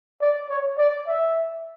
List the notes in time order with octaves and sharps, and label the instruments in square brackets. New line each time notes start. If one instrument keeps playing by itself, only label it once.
[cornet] D5
C#5
D5
E5